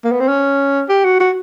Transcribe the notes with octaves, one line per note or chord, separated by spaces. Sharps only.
A#3
B3
C4
C#4
G4
F#4
F#4